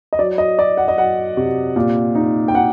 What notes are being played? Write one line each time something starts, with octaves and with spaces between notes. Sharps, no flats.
D#5
F#3 D5
D#5
F#3 D5
F#5
D#5
F#3 F#5
C3
A#2
D#4
G5
D#4 F#5